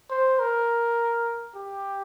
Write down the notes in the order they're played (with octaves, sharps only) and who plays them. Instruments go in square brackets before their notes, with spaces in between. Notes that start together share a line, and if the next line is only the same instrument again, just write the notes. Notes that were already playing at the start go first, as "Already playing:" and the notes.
[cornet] C5
A#4
G4